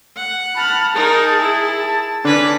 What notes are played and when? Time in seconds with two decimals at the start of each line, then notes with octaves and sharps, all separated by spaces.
0.16 F#5
0.56 A5 B5 F6
0.95 D#4 G#4 A#4
1.40 E4
2.25 D3 C#4 D4 B4 D6 B6